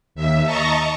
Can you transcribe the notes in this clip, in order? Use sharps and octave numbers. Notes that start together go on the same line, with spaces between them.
D#2 E5
D#5 A5 A#5 C#6